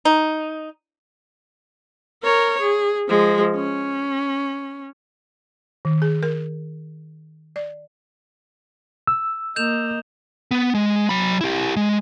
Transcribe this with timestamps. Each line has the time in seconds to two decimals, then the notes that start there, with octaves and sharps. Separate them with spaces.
0.05 D#4
2.23 A#4 C#5
2.61 G#4
3.08 F3 G#3
3.56 C#4
5.85 D#3
6.02 G#4
6.23 A#4
7.56 D5
9.07 E6
9.56 A#3 D#5 G6 E7 F7
10.51 B3
10.75 G#3
11.09 F#3 B5
11.41 E4 G4
11.76 G#3